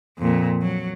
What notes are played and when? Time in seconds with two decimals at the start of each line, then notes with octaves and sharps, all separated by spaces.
0.18 F2 A#2
0.61 F#3